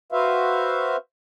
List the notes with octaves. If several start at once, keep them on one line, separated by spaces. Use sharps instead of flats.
F#4 B4 C5 E5 F5